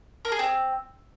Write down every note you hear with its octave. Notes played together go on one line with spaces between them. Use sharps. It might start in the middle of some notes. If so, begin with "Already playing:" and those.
A#4
G#4
C4